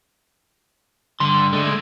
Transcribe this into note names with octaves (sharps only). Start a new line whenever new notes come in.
G2 D3 C6
D3 G#3 A3